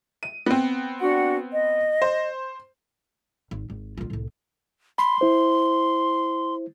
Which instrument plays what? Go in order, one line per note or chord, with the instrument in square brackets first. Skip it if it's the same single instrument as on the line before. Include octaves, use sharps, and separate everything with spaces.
[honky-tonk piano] D#7
B3 C4
[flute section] D4 F#4 F#5
D#5
[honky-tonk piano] C5
[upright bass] G#1
G#1
A1 F4
C2 A2
[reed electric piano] B5 [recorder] C6
[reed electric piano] E4 C5